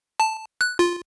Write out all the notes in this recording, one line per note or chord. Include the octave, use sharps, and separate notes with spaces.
A5
F#6
F4